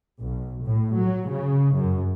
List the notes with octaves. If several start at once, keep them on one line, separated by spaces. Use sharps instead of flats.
B1
A2
F#3
C#3
F#2